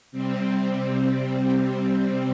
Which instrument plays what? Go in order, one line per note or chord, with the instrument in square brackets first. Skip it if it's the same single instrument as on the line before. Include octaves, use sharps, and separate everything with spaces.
[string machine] C3 G3 C4